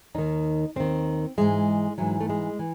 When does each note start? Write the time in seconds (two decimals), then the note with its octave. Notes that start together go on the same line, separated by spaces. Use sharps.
0.15 D#2 D#3 D#4
0.76 D#2 D#3 C4
1.37 G#2 E3 G#3
1.98 G#2 E3 F#3
2.20 A3
2.30 G#3
2.59 E3